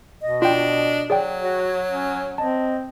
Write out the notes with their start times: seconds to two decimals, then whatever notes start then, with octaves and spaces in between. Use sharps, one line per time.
0.22 B2 D#5
0.42 D4 F4 G5
1.10 F#3 G#4 D5 G5
1.42 F#4 C#5
1.90 C#4
2.38 C4 D#5 A5